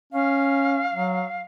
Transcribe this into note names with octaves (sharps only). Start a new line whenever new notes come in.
C#4 F5
F#3